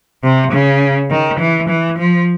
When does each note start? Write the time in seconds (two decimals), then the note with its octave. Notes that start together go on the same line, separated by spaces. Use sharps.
0.23 C3
0.52 C#3
1.11 D#3
1.40 E3
1.69 E3
1.99 F3